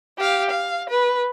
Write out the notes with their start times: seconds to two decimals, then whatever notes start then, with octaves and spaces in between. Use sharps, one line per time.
0.18 G4 F5
0.50 F5
0.90 B4